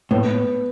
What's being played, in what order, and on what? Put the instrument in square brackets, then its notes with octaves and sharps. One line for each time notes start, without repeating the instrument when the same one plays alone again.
[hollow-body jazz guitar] A2 [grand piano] B3